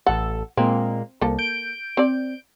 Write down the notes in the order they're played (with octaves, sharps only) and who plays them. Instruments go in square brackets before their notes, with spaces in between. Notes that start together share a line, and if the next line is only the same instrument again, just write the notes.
[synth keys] A1 A4 [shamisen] F#5
[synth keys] A#2 G#3 A#3 [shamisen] C4
[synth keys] C2 [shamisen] A#3 A4
[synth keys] G6 D7
[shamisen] C4 D5